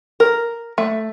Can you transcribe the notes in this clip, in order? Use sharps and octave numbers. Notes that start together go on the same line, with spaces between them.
A#4
A3